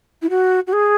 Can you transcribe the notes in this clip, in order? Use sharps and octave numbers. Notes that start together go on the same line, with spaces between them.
E4
F#4
F#4
G#4